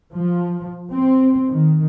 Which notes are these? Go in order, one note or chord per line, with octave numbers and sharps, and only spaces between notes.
F3
C4
D#3